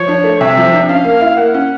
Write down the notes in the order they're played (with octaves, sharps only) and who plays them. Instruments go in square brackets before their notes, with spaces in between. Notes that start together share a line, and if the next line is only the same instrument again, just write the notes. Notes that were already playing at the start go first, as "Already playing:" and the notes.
Already playing: [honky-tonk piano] F3 [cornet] C#5
[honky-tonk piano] D4
A3
[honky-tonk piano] C3 [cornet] E5
[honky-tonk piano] F3
D4
[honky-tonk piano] C#4 [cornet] F5
[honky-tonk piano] A#3
E4
[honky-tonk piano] A#3 [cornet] F#5
[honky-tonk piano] C#4